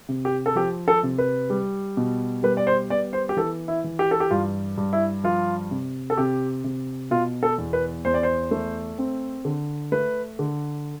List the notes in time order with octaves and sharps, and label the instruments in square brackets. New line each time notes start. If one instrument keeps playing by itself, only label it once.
[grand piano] C3
G4
A4
F3 G4
A4
C3
B4
G3
B2
G3 B4
D5
C5
B3 D5
C5
G4
E3 A4
E4
E3
G4
A4
G4
G2 F4
G2
E4
F3 F4
C3
A4
C3 G4
C3
B2 F4
A4
E2
B4
E2 C5
D5
C5
A3
C4
D3
A3 B4
D3